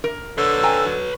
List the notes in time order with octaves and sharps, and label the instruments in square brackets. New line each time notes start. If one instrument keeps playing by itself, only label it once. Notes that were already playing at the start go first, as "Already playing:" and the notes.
[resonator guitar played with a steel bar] A#4
[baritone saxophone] D3 [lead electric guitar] B4 C#5 [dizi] E6
[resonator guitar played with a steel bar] G5 G#5 A#5
F#3